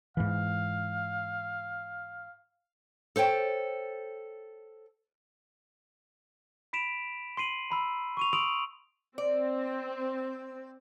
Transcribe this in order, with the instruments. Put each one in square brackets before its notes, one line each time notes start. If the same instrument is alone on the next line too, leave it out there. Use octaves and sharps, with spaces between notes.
[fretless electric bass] G#2 E3 [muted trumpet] F5
[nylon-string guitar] A4 C5 C#5 G5
[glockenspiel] B5 B6 D7 E7 F7
C6 C7 D#7 F#7
A#5 B5 E6
C#6 D#7 F7
C6 D#6 E6 D7 F7 F#7
[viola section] C4 [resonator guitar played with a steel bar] D5